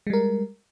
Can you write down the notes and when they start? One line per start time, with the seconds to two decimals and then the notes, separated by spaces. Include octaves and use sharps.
0.07 G#3
0.10 G3
0.13 A#4